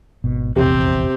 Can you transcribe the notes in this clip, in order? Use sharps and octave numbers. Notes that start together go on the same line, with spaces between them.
G#1 B2
F1 A#1 E2 C3 C4 G4